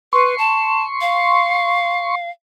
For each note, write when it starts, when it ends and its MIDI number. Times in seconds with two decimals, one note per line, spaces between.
0.13 0.35 71
0.13 2.15 84
0.13 2.15 85
0.38 0.85 81
1.01 2.30 77